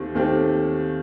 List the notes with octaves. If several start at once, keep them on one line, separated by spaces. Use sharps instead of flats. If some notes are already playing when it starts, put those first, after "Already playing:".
Already playing: D#2 D#3 A3 C4 G4
D#2 D#3 A3 C4 G4